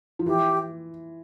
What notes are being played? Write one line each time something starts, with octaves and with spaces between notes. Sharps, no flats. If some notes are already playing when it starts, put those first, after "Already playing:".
F3
E3 G4